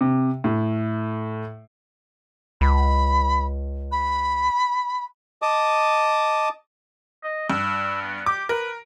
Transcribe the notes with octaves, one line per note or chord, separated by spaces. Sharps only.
C3
A2
C#2 B5
B5
D#5 A5 D6 D#6
D#5
G2 E6
B3
G4 D6
A#4 B4